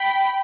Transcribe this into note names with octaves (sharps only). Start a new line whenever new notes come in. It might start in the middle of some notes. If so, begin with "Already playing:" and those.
Already playing: G5 B5